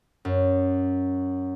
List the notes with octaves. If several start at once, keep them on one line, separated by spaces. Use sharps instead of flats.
F#2